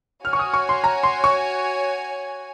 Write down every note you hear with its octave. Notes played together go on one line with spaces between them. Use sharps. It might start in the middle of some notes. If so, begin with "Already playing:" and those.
F#4 C#5 G#5 F6
C#6
D#6
C#6
C6
A#5
C6
C#6